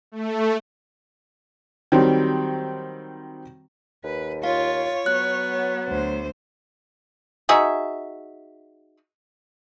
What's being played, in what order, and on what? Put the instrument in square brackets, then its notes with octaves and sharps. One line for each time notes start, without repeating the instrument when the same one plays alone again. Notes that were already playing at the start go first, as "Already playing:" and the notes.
[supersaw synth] A3
[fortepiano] D#3 F#3 G3 C4
[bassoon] D#2 [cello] B4
[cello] F4 [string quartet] C#5 [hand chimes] F5
[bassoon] F#3 [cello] B3 [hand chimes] F#6
[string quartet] D2 C5
[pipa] D#4 F#4 G#4 E5